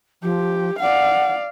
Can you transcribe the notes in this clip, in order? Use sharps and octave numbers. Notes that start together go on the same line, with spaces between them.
F3 G4
D5 F5 F#5